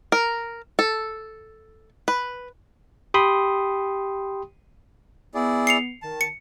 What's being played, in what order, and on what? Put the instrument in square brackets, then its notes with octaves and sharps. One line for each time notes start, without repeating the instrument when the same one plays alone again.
[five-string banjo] A#4
A4
B4
[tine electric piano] G4 G5 B5 C6 D#6
[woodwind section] B3 [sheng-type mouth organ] E4 G#4 D5
[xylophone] C7 C#7 F7
[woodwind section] D#3 [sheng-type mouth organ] A5
[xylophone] C#7